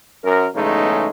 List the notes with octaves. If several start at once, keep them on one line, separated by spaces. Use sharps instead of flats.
F#2 A#4
B1 E2 C#3 G#3 A3 D#4